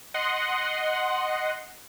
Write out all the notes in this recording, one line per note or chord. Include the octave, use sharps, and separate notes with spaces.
D#5 F#5 C6